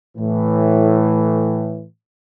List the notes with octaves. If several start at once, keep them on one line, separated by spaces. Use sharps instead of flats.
A2 E3